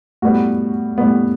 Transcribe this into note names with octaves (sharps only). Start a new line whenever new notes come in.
A2 G3 B3 F#4
A2 G3 B3